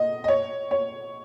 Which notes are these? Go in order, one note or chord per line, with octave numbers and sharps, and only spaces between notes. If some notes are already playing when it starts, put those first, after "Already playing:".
Already playing: D#5
D#5
C#5
C#5